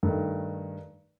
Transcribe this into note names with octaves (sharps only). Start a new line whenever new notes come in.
G2 D#3 A3